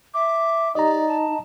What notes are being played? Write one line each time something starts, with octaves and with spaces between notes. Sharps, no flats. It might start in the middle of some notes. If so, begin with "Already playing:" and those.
E5 D6
D#4 G4 D5 D#5 A#5
A5